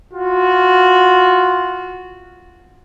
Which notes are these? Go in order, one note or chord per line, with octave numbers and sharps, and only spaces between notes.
F4 F#4